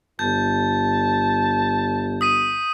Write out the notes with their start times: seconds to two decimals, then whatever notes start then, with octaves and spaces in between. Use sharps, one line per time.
0.19 G1 A5 G6
2.21 D#6 B6 D#7